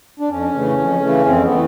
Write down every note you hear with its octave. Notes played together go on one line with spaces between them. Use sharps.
D4
F2 C#4
C#3 E3 A3
F2
C#3 E3 A3
F2 C4
B3
E3 A3